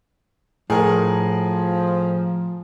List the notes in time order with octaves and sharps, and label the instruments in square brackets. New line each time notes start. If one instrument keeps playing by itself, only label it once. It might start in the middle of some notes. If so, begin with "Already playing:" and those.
[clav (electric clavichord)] A2 [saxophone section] F3 [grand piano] G#4 A#4